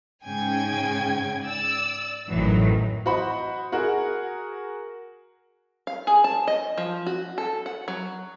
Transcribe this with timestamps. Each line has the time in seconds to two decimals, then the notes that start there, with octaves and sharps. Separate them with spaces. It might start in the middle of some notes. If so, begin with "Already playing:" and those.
0.24 G#2 C#3 G5 G#5 G#6
1.43 D5 E6
2.30 A1 F#2 A2 D#3 E3 F#3
3.06 F#4 C5 D#5 F#5 B5
3.72 F#4 G#4 A#4 F#5
5.87 F5
6.07 G#4
6.24 A5
6.48 D#5
6.78 F3
7.06 F#4
7.38 A4
7.66 F#5
7.88 F#3